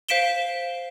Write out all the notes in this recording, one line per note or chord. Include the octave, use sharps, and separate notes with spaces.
C5 F5 B6 D7 E7 G7